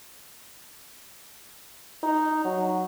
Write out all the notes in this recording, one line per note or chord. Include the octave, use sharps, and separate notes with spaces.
D#4
F#3